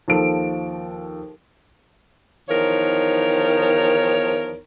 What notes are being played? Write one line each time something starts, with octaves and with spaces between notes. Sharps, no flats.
D#2 F3 A4 D7
E2 D#3 F3 D#4 A#4 C#5